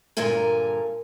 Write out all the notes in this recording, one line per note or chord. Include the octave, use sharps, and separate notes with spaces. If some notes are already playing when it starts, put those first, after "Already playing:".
G2 A#2 D3 A#4 G#5